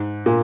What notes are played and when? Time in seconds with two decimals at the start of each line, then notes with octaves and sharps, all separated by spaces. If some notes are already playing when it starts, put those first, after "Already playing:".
Already playing: G#2
0.26 A#2